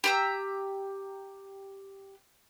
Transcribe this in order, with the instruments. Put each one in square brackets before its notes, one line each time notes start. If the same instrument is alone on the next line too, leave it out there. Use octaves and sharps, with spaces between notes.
[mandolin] G4 A#5 E6